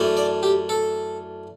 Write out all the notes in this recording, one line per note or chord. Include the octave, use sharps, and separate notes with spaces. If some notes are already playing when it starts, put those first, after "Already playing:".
Already playing: F#2 E3 A3 D4
D5
G4
A4